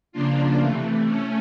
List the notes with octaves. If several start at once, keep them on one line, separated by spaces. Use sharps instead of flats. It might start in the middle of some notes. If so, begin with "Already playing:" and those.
C#3 F3 A#3 D4 F4
C3 E3 A3
A3 C#4